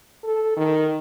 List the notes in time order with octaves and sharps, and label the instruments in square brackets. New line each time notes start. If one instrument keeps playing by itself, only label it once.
[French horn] A4
D#3